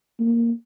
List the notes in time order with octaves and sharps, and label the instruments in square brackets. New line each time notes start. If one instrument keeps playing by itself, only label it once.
[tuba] A#3